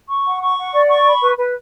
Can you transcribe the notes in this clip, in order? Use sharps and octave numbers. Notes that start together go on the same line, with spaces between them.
C#6
F#5
C#6
F#5
D5
C#6
B5
B4
B4